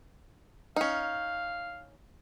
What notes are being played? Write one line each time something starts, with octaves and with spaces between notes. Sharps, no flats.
C#4 D#4 F5